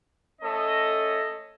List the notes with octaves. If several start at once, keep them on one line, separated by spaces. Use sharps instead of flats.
A3 C#4 A4 C#5 D#5